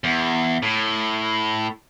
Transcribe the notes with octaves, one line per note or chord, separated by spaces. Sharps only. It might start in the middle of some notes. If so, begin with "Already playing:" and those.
E2
A2